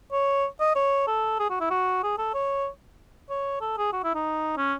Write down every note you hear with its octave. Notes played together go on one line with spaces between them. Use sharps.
C#5
D#5
C#5
A4
G#4
F#4
E4
F#4
G#4
A4
C#5
C#5
A4
G#4
F#4
E4
D#4
C#4